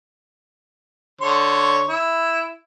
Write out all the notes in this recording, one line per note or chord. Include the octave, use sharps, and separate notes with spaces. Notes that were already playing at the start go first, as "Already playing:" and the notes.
D3 C#5 C6
E4